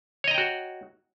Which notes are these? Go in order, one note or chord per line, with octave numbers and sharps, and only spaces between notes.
F#4 C#5 D#5 G5 A#5